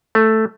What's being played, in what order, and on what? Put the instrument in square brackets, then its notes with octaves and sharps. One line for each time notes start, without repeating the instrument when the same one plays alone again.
[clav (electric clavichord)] A3